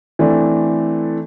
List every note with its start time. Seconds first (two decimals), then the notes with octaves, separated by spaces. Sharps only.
0.19 E3 A3 C4 D4